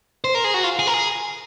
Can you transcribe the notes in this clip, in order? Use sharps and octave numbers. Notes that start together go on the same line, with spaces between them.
C5
A#4
G#4
F#4
F4
G#4
A#4
G#4